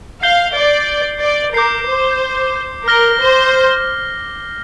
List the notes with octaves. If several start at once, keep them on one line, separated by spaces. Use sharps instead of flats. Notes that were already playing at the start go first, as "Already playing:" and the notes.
F5 G6 C7 G7
D5
D5
A#4 D6 G6 C7
C5
A#4 F6 A#6 G7
C5